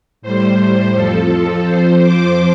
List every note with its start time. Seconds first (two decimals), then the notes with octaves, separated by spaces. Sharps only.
0.22 A2 G3 C5
0.94 F2 F3 A4
1.65 F2 F3 C5
2.02 D6